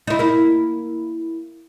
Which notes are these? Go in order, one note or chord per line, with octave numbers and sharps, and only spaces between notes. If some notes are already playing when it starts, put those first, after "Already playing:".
D#4 E4
A#3 E4